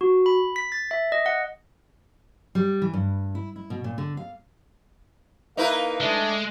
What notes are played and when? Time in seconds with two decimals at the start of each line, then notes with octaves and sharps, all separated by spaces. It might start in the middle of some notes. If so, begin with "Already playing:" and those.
0.01 F#4
0.26 B5
0.56 B6
0.72 A6
0.91 E5
1.12 D#5
1.26 F#5
2.55 G3
2.82 E3
2.93 G2
3.35 E4
3.56 E4
3.70 B2
3.84 A#2
3.98 D3
4.17 F5
5.57 A#3 D#4 E4 B4 F5
6.00 G#3 A3 D4